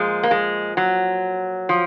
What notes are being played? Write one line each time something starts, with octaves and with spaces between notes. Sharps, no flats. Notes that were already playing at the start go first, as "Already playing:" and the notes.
Already playing: A#2 F3 G#3
A#3
G#3
F#3
F3